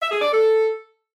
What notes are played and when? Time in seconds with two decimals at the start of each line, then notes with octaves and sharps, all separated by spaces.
0.01 E5
0.11 G#4
0.22 D5
0.32 A4